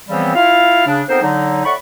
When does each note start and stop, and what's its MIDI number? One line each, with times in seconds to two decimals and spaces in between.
0.09 0.31 49
0.09 0.31 52
0.09 0.31 53
0.09 0.31 55
0.09 0.31 59
0.09 0.31 60
0.35 0.86 64
0.35 0.86 65
0.35 0.86 77
0.86 1.02 49
0.86 1.02 62
1.09 1.20 41
1.09 1.20 59
1.09 1.20 60
1.09 1.20 63
1.09 1.20 70
1.09 1.20 72
1.22 1.65 50
1.22 1.65 54
1.22 1.65 63
1.65 1.74 45
1.65 1.74 74
1.65 1.74 78
1.65 1.74 83
1.65 1.74 85